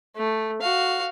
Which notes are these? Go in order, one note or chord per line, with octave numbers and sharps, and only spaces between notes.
A3
F#4 F5